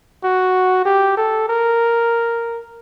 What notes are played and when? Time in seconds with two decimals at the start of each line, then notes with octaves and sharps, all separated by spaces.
0.24 F#4
0.85 G4
1.17 A4
1.49 A#4